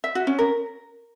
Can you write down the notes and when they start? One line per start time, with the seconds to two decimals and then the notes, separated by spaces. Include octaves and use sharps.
0.04 E5
0.15 F#4
0.27 C#4
0.39 A#4